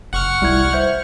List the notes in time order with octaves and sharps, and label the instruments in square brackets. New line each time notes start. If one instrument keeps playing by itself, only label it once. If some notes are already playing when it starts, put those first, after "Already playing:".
[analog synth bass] F#1 [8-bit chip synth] F#5 C#6 F6
[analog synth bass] C2 [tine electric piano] G3 E4 G#6
[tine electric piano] C5 E5 G6